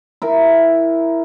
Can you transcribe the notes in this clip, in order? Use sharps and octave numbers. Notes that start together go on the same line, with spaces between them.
E4 A#4